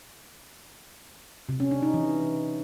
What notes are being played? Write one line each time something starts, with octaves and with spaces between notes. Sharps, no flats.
C3
C#4
D4
D#4
E3